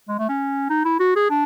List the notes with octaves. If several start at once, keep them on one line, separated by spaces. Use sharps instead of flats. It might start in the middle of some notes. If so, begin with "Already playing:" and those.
G#3
A3
C#4
D#4
E4
F#4
G#4
D4